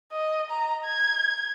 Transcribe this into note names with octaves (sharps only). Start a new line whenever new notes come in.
D#5
A#5
G#6